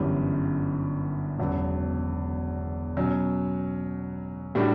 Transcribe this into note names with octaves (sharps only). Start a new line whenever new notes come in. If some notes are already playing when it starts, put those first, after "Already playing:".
Already playing: G1 F#2 E3 G3
E1 E2 C#3 F#3 B3
B2 F#3 C#4
A2 G3 D4 F#4